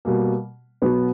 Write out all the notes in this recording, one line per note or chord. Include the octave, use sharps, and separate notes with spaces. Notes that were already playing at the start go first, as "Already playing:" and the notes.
B2 G3 A#3
B2 F#3 B3